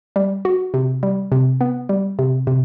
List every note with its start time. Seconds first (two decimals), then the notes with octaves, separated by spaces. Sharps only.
0.16 G3
0.45 F#4
0.74 C3
1.03 G3
1.32 C3
1.61 B3
1.89 G3
2.19 C3
2.47 C3